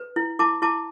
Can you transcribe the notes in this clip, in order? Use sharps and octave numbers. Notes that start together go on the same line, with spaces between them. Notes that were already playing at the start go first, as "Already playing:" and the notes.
Already playing: B4
E4
E4 A5 D6
E4 A5 D6